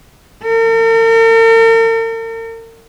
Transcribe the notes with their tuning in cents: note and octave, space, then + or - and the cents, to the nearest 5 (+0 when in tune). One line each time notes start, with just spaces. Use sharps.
A#4 -45